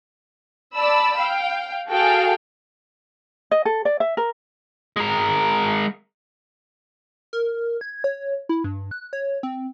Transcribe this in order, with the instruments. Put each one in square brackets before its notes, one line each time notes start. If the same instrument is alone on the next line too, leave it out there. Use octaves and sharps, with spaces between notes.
[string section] D5 A5 B5 E6
F5 G5
F#4 G#4 A4 F5 G5
[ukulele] D#5
A4
D5
E5
A#4
[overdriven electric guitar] G#3 A#4
[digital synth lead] A#4
G#6
C#5
E4
G2
F#6
C#5
C4